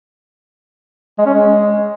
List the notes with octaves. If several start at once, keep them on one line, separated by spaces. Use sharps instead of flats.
G#3
C#4
G#3